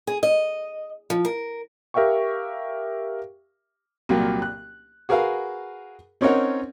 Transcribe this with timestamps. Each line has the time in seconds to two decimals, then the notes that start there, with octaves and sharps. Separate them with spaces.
0.07 G#4
0.23 D#5
1.10 F3
1.25 A#4
1.94 G4 A#4 E5 F5 G5 C#6
4.09 C2 A#2 F#3 A#3
4.42 F#6
5.09 F#4 G#4 A#4 B4 F5
6.21 C4 C#4 D#4 A#4 C#5 F#5